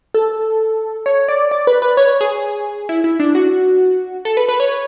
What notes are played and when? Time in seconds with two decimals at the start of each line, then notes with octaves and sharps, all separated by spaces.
0.14 A4
1.06 C#5
1.29 D5
1.51 D5
1.67 B4
1.82 B4
1.97 C#5
2.21 G#4
2.89 E4
3.04 E4
3.20 D4
3.35 F#4
4.25 A4
4.37 B4
4.49 B4
4.60 C#5